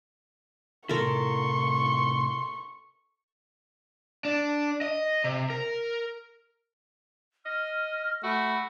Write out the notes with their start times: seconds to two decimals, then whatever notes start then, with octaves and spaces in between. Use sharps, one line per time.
0.89 A2 C3 E4 A4 A#4 C6 C#6
4.25 D4
4.81 D#5
5.24 C3
5.50 A#4
7.46 D#5 F6
8.24 A3 F#4 B5